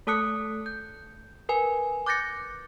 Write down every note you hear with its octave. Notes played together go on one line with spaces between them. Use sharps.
A3 A4 A5 D#6 F#6 C#7
G6
A#4 B4 G#5
D6 F#6 G6 A6 A#6 C#7